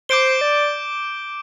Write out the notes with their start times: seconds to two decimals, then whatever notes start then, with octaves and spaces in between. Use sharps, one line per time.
0.09 C5 D6 G6 D7 G7
0.41 D5